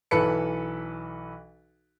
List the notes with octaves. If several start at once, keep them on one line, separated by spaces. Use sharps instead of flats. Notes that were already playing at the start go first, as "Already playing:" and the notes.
B1 E3 A4 B4 B5 C#7